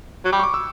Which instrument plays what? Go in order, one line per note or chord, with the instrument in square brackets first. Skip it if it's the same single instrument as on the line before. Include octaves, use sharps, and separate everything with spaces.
[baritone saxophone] F#3
[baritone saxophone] G3 [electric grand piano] D6
[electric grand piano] C#6
D6
E6